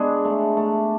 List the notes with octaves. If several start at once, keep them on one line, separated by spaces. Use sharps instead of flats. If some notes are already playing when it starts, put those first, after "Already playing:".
Already playing: G#3 B3 D4
A3
A3